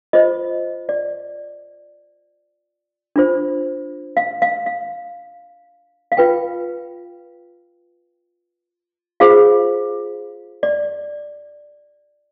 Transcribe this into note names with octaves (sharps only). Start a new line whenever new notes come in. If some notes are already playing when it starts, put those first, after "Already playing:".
F4 C5 D#5
D5
D4 F4 C5
F5
F5
F5
F5
F4 B4 G5
F4 G#4 C5 F5
D5